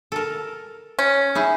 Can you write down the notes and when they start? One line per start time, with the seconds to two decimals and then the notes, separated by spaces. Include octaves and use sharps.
0.12 A4 A#4
0.99 C#4
1.35 D#4 E4 G#4